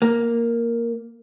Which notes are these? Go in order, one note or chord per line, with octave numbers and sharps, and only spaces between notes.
A#3